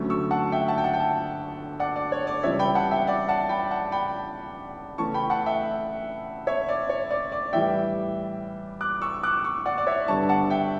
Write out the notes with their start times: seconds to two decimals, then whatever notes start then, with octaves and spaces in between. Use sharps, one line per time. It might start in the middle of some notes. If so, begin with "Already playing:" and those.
Already playing: D2 D3 F#3 A3 C#4
0.10 C#6 E6
0.31 F#5 A5
0.52 E5 G5
0.68 F#5 A5
0.78 G5
0.84 F#5 A5
0.94 G5
1.00 F#5 A5
1.80 D5 F#5
1.96 D5
2.12 C#5
2.27 D5
2.43 C#2 C#3 E3 G3 C#5 E5
2.59 G5 B5
2.75 F#5 A5
2.91 E5 G5
3.07 D5 F#5
3.29 F#5 A5
3.49 G5 B5
3.71 F#5 A5
3.92 G5 B5
4.98 C#3 E3 A3 C#4 A5 C#6
5.14 G5 B5
5.30 F#5 A5
5.46 E5 G5
6.47 C#5 E5
6.68 D5
6.89 C#5
7.11 D5
7.32 D5
7.53 A2 E3 G3 E5 G5
8.81 D6 F#6
9.01 C#6 E6
9.23 D6 F#6
9.44 C#6 E6
9.66 D5 F#5
9.78 D5
9.87 C#5 E5
10.08 G2 D3 G3 B3 A5 C#6
10.29 F#5 A5
10.50 E5 G5